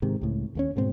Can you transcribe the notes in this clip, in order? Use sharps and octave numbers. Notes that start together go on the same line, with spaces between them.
G#2 C3 D#3
C#2 A2
D#2 A3 C#4
D2 G#2 B2 C4